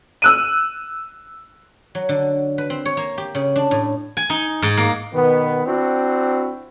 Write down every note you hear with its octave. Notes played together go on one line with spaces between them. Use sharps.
E6 F#6 D#7
F#3
D3
B4
C4
C#5
A#3
G4
C#3
D4
A2
G#5
D#4
G#2
A#3
B2 D#3 B3
C4 D4 E4 F#4